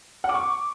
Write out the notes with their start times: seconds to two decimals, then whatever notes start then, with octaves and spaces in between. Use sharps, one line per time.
0.24 F#5
0.29 D6
0.34 C#6